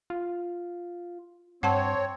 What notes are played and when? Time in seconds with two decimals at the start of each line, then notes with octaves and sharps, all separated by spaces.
0.10 F4
1.63 G2 C4 C#5 F#5 A5 C6